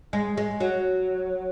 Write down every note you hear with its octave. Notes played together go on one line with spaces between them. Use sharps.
G#3
G#3
F#3